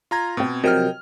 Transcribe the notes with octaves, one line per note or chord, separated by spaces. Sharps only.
F4 A#5 G#6
B2 C4 G5
C3 F3 F#3 A#4 D#5 G5 F6